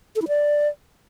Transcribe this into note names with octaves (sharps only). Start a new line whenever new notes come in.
A4
E4
D5